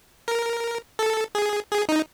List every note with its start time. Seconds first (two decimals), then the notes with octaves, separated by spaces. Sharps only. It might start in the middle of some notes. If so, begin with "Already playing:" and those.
0.28 A#4
0.99 A4
1.35 G#4
1.71 G#4
1.89 D#4